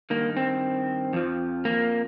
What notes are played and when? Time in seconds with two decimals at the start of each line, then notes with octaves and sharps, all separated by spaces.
0.10 G2 D#3 A#3
0.37 C4
1.13 F2 F3
1.65 A#3